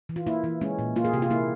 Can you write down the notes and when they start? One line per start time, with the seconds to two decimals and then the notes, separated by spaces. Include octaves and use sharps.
0.09 E3
0.16 F4
0.27 A#3 E4
0.44 E3
0.61 G#3 C#4
0.79 A#2
0.96 A#3 F4
1.05 G#4
1.13 C3 G4
1.22 F4
1.31 A#3 E4